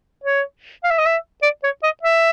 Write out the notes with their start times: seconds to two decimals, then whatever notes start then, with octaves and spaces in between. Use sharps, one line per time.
0.24 C#5
0.84 F5
0.91 E5
0.98 D#5
1.06 E5
1.42 D5
1.64 C#5
1.83 D#5
2.03 E5